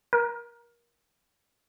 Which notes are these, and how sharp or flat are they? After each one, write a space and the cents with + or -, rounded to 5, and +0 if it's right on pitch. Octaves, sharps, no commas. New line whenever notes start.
A#4 +25